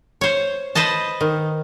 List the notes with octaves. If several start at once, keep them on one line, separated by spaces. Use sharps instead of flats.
C5 C#5
B4 C5 D#5 A5
D#3